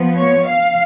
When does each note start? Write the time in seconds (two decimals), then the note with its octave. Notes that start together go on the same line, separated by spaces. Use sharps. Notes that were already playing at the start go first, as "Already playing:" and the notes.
Already playing: F3 B3
0.17 C#5
0.47 F5